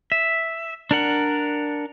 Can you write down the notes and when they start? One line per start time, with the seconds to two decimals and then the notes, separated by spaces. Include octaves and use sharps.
0.12 E5
0.91 D4 A#4 F#5